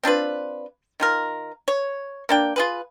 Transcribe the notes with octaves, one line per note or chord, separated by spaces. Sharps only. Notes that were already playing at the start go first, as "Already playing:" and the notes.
C4 D4 F4 B4
D#3 F4 A#4
C#5
A#3 D4 G5
F4 G#4 B4